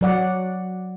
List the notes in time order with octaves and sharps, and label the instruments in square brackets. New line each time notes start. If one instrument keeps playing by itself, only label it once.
[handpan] F#3 D5 F#5